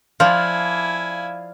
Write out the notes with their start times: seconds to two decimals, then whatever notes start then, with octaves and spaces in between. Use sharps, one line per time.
0.20 F3 E4 D5 F5 G#5